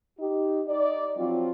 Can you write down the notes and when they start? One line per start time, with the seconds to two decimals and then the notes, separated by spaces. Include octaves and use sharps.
0.20 D#4 G4
0.68 D#4 D5
1.17 F3 F#3 C4 F4